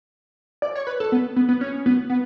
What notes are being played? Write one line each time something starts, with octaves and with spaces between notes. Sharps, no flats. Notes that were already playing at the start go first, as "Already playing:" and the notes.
D5
C#5
B4
A4
B3
B3
B3
C#4
B3
B3